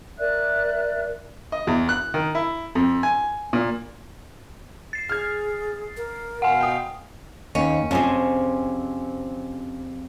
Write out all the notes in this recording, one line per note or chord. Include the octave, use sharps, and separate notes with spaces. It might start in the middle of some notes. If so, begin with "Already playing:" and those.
A#4 D5 E5 F#6
D#5
E2
F#6
D#3
E4
F2
G#5
A#2
A6 C7
G#4 F6 G#6
A#4
B2 F5 F#5 G#5
G5 D#6
D#2 C#4
F2 C3 C#4 G#4 C5